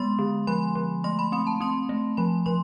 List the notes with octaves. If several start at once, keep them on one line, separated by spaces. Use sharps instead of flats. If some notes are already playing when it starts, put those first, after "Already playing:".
Already playing: G#3 B3 C6
D3
F3 B5
F3
A3 C6
B5
C4 B5
A5
C4 C6
A3
F3 B5
F3 C6